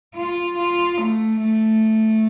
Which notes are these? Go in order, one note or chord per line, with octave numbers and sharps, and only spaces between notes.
F4
F4
A3
A3